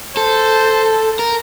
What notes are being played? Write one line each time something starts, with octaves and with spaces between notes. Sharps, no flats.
A4 C5
A#4